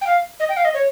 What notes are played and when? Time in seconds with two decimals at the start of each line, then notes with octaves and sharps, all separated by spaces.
0.01 G5
0.07 F5
0.40 D#5
0.49 G5
0.57 F5
0.65 D#5
0.74 C#5